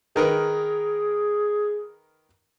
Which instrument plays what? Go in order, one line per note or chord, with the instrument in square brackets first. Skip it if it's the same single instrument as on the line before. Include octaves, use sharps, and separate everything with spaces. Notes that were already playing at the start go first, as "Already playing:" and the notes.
[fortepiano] D#3 A#4 B4 [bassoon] G#4